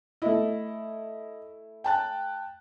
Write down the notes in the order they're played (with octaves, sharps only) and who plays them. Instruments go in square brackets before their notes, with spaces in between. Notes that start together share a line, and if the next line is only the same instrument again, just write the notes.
[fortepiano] A3 E4 [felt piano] D#5
[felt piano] G5 A5 F#6